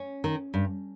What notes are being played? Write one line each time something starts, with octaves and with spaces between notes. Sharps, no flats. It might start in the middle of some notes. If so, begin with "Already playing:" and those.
Already playing: C#4
D#3
G2